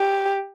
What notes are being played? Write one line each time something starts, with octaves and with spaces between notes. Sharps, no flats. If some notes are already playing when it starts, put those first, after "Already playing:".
Already playing: G4